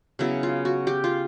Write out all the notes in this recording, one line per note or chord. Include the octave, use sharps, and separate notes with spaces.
C#3 F#3 B3 E4
F4
F#4
G4
F4